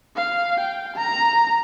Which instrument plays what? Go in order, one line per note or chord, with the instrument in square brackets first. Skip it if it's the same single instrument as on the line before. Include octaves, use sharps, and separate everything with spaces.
[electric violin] F5
G5
A#5